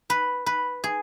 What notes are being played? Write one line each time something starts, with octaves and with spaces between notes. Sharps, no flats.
B4
B4
G#4